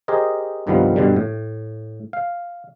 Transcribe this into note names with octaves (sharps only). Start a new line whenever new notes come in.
G4 G#4 A#4 C5 D#5
C2 G2 D#3 F3 G3 B3
G2 B2 D3 G3
A2
F5